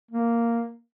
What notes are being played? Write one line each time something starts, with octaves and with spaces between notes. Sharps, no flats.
A#3